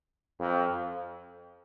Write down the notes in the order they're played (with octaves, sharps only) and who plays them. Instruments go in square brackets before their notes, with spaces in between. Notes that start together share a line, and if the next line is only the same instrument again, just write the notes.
[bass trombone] F2